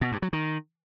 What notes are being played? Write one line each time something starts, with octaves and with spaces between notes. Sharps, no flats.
B2
G2
F#3
D#3